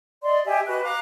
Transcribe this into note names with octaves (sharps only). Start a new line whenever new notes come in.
D5 D#5 C6
G4 D#5 E5 G#5
F#4 B4 D#5 F#6
F5 A#5 D6 F#6